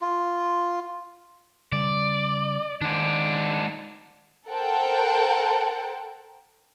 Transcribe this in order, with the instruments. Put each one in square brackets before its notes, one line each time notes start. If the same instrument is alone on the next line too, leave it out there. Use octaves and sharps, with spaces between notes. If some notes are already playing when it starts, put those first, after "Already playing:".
[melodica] F4
[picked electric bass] C#3 G3 [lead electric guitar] D5
[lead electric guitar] G#2 D4 [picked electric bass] D#3
[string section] A4 A#4 C5 F#5 G5 A5